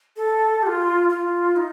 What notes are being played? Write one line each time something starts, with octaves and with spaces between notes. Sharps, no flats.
A4
G4
F4
F4
D#4